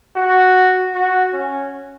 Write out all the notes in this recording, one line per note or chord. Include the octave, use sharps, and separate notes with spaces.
F#4
F#4
C#4